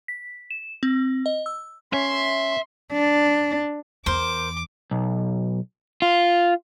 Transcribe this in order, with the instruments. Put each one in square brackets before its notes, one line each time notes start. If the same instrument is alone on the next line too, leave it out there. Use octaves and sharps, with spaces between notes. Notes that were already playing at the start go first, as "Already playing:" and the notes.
[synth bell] B6
E7
C4
D#5
E6
[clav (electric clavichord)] C#4 [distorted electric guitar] E5 [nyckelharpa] C6
[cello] D4
[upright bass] E2 [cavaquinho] A#4 C5 [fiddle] D6
[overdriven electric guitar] B1
F4